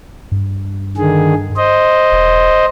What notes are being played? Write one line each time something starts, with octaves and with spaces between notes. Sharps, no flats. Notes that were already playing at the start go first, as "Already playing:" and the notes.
G2
D3 D#3 G#4
C5 D#5
E1